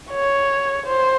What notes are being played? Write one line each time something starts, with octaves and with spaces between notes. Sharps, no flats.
C#5
C5